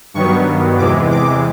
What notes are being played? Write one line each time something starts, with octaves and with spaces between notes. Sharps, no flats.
G2 D#3 F#3 B3 C#6
E2 C3 E3 G#3 D6
D6